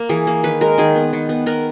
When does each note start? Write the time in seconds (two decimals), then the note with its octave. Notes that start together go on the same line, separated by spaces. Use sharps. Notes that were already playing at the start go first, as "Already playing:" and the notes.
Already playing: A#3
0.09 E3 G#4
0.27 A#3
0.43 D#3 B4
0.61 G#3 A#4
0.78 D#3 G#4
0.95 B3
1.13 D#3
1.29 B3
1.46 B3 A#4